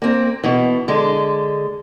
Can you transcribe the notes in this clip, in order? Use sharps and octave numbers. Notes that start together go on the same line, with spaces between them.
A#3 C4
B2 E3
D3 G#3